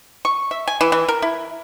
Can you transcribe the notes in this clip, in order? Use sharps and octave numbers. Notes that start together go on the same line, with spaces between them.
C#6
E5
G#5
E3
E3
A#4
E4